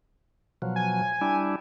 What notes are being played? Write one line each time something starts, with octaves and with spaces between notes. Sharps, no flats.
B2 F3 F#3
G#5
G3 D4 E4